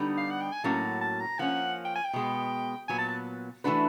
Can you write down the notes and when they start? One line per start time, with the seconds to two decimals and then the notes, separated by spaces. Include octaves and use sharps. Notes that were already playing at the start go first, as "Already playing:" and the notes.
Already playing: D3 G3 B3 D#4
0.18 F5
0.30 F#5
0.41 G5
0.52 G#5
0.64 A2 F#3 A#3 C#4 F#4 A5
1.01 A5
1.20 A#5
1.39 F3 A#3 C#4 F#5
1.85 G5
1.96 G#5
2.05 G5
2.13 B2 G#3 B3
2.88 A#2 F#3 B3 G#5
2.98 A5
3.08 A5
3.64 E3 A3 D4 F#4 B4